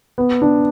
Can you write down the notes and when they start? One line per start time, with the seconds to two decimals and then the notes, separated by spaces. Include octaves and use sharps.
0.18 B3
0.42 D4